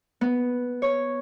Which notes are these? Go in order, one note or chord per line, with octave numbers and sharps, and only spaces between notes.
B3
C#5